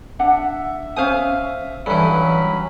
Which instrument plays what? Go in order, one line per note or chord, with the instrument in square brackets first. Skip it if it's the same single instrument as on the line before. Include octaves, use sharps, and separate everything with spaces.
[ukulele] D4 F#5 [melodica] E5
[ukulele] C#4 C5 G#5 [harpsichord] F5 D#6
[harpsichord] G2 E3 [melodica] F#3 C#4 B5 [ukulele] A4